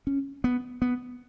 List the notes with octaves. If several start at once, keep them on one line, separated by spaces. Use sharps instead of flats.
C#4
B3
B3